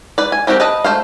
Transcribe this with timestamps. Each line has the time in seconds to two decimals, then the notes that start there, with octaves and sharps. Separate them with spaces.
0.18 B4 D5
0.32 G#5
0.47 G3 C4 F#4 G4 A#4
0.60 B4 D#5 A5
0.84 A3 C5 F5